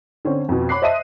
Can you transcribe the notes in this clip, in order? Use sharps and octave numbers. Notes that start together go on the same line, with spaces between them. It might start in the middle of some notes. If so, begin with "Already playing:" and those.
D3 C4 C#4
F2 B2
C#5 B5 D6 F#6 C7
C5 D#5 E5 A5 D#6 D#7